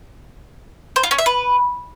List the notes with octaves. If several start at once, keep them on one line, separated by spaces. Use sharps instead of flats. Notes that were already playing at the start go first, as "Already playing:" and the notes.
C5
F4
C#4
E5
B4